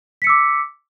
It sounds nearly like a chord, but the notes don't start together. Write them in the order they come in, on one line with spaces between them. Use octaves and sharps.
B6 C#7 E6 D6